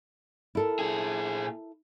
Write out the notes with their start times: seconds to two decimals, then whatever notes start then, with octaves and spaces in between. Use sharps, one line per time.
0.55 E4 A4 A#4
0.79 A#2 G#4